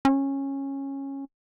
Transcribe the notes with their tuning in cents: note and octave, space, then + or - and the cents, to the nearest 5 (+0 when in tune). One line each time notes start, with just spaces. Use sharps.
C#4 -15